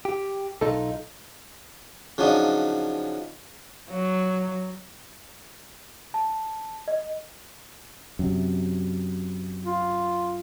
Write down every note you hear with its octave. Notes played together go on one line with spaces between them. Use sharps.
G4
B1 D#4 F4 A4
C#3 F3 F#3 D4 D#4
F#3
A5
D#5
F#2 C3
F4